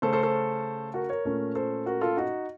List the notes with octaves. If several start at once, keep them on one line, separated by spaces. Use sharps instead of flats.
C#3 A3 C#4 A4 C5
A4 C5
A4 C5
F#4 A#4
A#4 C#5
A#2 A3 C#4
A4 C5
F#4 A#4
F4 A4
D#4 F#4